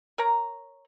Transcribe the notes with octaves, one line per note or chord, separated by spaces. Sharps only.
A#4 C#5 A#5